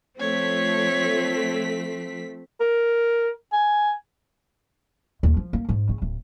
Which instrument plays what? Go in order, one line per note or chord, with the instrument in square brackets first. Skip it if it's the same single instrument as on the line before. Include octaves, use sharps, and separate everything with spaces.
[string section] F3 A3 B6 [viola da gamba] C4 [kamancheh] C#5
[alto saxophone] A#4
G#5
[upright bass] D#2
F3
A#3
G#2
C#3
D1